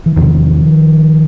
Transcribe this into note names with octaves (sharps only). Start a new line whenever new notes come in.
E3
E2 C3 D#3 F3